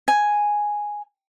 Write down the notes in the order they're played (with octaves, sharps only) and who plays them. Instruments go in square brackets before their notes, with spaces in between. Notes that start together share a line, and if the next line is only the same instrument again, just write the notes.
[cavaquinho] G#5